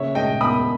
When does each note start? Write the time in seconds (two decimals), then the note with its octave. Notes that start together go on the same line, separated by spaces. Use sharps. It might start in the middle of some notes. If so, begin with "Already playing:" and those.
Already playing: C#3 A#3 C#5 E5
0.15 G#3 D#5 G5
0.41 E2 B5 D#6